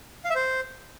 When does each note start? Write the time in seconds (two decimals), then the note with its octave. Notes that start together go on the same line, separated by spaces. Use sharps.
0.25 F5
0.30 E5
0.35 C5